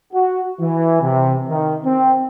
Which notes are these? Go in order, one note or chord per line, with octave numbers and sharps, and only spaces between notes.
F#4
E3
C3
D#3
C4